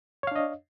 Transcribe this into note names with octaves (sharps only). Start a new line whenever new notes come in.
D4 C#5 D#5 F5